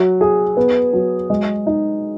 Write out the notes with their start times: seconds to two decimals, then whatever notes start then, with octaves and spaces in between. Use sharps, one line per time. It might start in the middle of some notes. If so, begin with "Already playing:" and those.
Already playing: F#3
0.21 G#4
0.57 B3
0.93 F#3
1.30 G#3
1.67 D#4